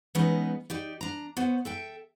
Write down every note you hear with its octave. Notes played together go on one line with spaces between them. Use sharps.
E3 G#3 B3 C#4 D#4 B4
D#4 G4 D5
D4 A#5
B3 C5 C#5
A4 E5 G5